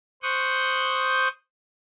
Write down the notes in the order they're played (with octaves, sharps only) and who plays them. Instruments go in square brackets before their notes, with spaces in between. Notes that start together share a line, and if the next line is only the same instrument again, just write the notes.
[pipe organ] C5 C#6 D#6 F#6 G6